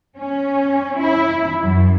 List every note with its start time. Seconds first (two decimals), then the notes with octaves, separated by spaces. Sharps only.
0.19 C#4
1.01 E4
1.63 F#2